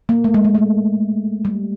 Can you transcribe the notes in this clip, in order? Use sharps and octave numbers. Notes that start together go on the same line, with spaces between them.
A#3
A3
G#3
G#3
A3
G3